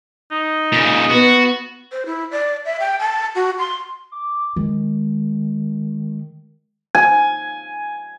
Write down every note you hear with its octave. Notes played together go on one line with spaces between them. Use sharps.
D#4
A#2 C#3
B3 F#4
C5
E4
D5
E5
G5
A5
F#4
C6
D6
D#3 G#3
G#5